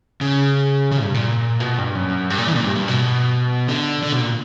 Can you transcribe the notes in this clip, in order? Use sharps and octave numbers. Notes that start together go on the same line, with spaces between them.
C#3
C#3
G2
A#2
B2
G2
F#2
G2
A#2
E3
A#2
G2
G2
B2
D3
D3
B2
A#2